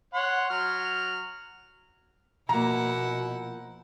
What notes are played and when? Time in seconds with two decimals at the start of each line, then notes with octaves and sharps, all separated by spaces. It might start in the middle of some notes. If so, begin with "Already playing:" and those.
0.14 C#5 F#5 C6
0.50 F#3 F6
2.49 B2 F3 A#3 E4 F#5 A#5